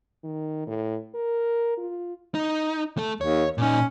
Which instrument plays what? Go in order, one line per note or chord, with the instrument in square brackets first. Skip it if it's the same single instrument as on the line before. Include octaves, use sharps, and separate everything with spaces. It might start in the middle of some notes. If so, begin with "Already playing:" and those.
[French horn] D#3
A2
A#4
F4
[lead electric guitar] D#4
A3 A4
[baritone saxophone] D#2 [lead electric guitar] C#5
[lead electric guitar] A#2 D#4 [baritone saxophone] C#4